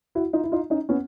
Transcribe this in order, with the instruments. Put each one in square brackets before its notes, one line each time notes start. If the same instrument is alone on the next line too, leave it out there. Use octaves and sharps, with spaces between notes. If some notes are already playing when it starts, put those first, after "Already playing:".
[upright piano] E4 F#4
D#4 F4
E4
D#4 F4
C#4 D#4
B3 C#4